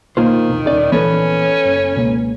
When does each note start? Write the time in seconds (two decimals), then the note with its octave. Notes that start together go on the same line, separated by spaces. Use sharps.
0.17 B1 D#3 A#3 F4 C5
0.49 E1 C2 B2
0.67 D#1 C#4 D5
0.92 A#1 E3 B3 C#4 A4 B4
1.65 F#1
1.96 C#2 B2 A#3